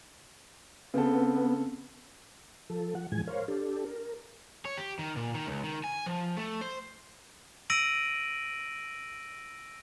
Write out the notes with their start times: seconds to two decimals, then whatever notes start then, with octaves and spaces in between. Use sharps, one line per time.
0.94 C#3 B3 C4 A4
2.70 F3 A4
2.95 F3 F#5
3.12 A2 E3 F3 G#3 G#5 G#6
3.27 A#4 C5 C#5 F5
3.48 D4 G4 A4
3.85 A#4
4.65 C#5
4.77 G4
4.99 D#3
5.16 A#2
5.34 D#3
5.47 C#2
5.64 D#3
5.84 G#5
6.06 F3
6.37 A3
6.61 C5
7.70 E6 A#6 D7 D#7 F#7